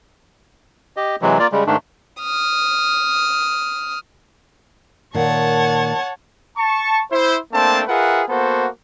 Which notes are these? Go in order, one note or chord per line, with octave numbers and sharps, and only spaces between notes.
G4 D#5
C3 E3 F#3 G#3
A#3 F4 D5
C#3 G3 G#3
G#2 D#3 A3 D4
D#6 F6
A#2 D#3 C#5 F#5 A5
A5 C#6
E4 C5
A3 A#3 C4 D4 C5 A5
F4 G#4 A#4 B4 E5 F#5
A#3 B3 F#4 A4 C5